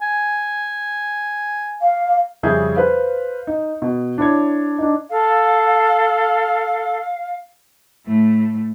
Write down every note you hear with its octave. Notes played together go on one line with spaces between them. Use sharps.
G#5
F5
F2 C#3 G3 G#4 E5 G6
B4 C5 F5
D#4
B2
D4 E4 C#5 G#6
D4 D#4
A4 F5
A2 A3